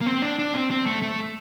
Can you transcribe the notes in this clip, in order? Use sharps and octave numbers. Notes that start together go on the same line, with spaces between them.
A#3
C4
D4
D4
C4
C4
A3
A3